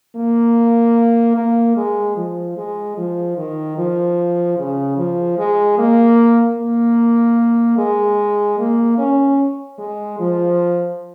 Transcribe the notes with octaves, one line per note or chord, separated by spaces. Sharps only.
A#3
A#3
G#3
F3
G#3
F3
D#3
F3
C#3
F3
G#3
A#3
A#3
G#3
A#3
C#4
G#3
F3